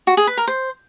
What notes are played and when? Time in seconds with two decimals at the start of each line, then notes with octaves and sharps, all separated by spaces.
0.07 F#4
0.17 G#4
0.27 B4
0.37 A#4
0.48 C5